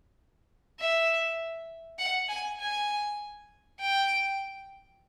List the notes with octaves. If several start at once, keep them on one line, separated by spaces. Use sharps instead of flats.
E5
F#5
G#5
G#5
G5